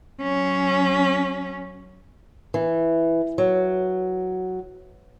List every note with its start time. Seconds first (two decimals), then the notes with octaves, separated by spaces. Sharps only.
0.22 F#3 C#4
2.54 E3
3.38 F#3